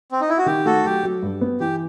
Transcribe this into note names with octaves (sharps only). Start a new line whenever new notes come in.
C4
D#4
E4
F#4
D#3 G4
A3 F#4 A4
F#3 G4
F#3
G2
B3
E3 G4